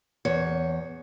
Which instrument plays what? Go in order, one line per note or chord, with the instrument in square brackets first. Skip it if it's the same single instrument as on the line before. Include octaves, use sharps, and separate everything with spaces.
[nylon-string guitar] E2 C#5